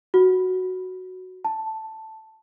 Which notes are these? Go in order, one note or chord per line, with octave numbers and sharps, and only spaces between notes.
F#4
A5